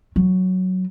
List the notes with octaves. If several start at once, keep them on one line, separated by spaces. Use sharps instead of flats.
F#3